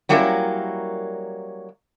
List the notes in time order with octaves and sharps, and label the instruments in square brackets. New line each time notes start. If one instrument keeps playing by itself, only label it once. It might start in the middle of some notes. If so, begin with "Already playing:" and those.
[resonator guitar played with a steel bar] F#3 G3 A#3 C#4 E4 A#4